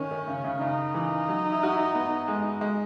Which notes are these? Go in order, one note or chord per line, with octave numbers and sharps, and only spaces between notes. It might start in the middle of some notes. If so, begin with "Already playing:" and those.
Already playing: D#3 C#4
D#3
C#3
C#3
C#3 D#4
E3
F#3
E4
F#4
E4
B3
G#3
G#3